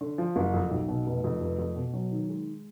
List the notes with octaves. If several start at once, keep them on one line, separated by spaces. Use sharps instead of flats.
D3
F3
F#1
F2
B1
B2
F1
F2
F1
F2
B2
F#3
D#3
G#3